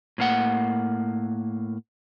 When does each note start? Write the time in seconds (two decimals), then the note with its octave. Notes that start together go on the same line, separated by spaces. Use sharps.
0.18 A2 A#3 F#5